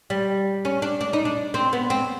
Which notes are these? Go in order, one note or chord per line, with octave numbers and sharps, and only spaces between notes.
G3
C#4
D4
D4
D#4
D4
C4
B3
C4